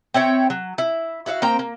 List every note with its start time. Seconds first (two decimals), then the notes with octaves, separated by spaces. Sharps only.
0.14 C4 E4 C#5 G5
0.50 F#3
0.78 E4
1.26 E4 F#4 E5 F5
1.42 A#3 C4 G5 A#5
1.59 A#3